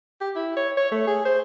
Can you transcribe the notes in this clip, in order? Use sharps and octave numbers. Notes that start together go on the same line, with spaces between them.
G4
E4
C#5
C#5
A3
G#4
C5